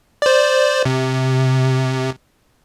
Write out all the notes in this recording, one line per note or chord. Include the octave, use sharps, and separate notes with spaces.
C5 D5
C3